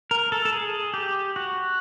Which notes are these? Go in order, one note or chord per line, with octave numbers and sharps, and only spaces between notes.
A#4
A4
A4
G#4
G4
F#4